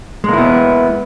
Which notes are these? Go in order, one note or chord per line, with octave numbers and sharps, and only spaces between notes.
G#3 A#3 B3 E4